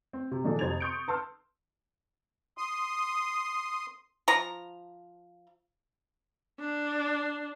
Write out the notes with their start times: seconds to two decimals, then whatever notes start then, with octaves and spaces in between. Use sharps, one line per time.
0.13 C4
0.31 C3
0.44 A#2 D#3 F3 D4 G#4 A4
0.59 F2 C3 C5 G#6 A6 F7
0.80 C6 C#6 D#6 G6 C#7 D7
1.08 B4 A5 C6 E6 F6
2.58 C6 D#6
4.28 F3 A#5
6.60 D4